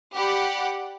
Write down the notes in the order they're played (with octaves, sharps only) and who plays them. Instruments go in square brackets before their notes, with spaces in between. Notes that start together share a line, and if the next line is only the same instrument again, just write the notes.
[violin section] G4 D5 F#5 B5